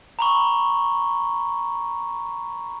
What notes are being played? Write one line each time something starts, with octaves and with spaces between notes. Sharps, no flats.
A#5 B5 C#6